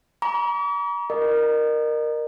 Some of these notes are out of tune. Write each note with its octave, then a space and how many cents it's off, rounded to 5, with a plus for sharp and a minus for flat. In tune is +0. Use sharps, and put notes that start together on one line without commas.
A#5 +35 D6 -45
A#4 +0 D#5 -40